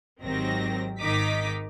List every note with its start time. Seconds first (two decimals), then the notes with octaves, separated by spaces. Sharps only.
0.22 G#1 D#3 F#3 C4 G4 A#6
1.00 G#1 G#2 D#3 D#4 D6 B6